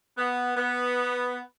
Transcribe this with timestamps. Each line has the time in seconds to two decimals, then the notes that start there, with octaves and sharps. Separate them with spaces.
0.17 B3
0.56 B3